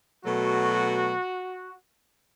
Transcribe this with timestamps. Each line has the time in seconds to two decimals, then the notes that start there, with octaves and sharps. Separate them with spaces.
0.24 B2 F#3 A3 F#4